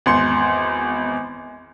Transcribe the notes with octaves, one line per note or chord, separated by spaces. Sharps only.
G#1 E2 C6 C#7